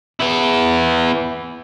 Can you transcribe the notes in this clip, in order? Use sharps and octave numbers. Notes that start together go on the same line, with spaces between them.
B3 E4